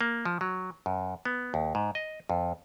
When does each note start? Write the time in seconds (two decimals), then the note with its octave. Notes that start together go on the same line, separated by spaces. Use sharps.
0.01 A#3
0.25 F3
0.41 F#3
0.86 F#2
1.25 B3
1.54 D#2
1.75 G#2
1.95 D#5
2.30 F2